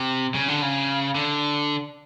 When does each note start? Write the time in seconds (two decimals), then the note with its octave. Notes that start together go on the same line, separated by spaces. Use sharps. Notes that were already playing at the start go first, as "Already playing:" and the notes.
Already playing: C3
0.35 C#3
0.48 D3
0.62 C#3
1.15 D3